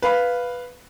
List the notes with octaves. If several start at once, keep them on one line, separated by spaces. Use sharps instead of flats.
B4 F5 B5